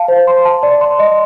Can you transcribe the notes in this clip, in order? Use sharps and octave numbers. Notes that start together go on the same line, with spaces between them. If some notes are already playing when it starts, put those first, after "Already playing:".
Already playing: F5 A5
C5
C6
A5
D5
C6
D#5